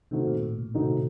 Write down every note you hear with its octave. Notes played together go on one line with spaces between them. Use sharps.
C3 D#3 A3 C4 D#4 F#4
A#2
A2
A#2
C3 D#3 A3 C4 D#4 F#4